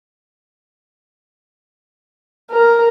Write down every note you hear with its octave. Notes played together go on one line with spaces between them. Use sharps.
A#4